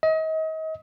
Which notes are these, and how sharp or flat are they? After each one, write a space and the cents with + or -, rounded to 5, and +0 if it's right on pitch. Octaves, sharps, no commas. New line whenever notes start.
D#5 +35